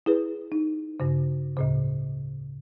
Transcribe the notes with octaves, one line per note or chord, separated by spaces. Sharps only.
E4 G#4 B4
D#4
G2 C#3
D2 A2 C#3